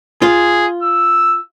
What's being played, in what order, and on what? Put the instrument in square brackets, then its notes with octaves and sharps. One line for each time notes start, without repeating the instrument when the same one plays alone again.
[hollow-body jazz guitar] F4 [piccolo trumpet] G#4
[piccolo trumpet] E6